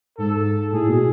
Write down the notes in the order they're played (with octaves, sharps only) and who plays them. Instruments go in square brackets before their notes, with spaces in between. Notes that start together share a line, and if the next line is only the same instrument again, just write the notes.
[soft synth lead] G#2 [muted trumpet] A4
[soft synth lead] A2 [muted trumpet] G#4
[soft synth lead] B2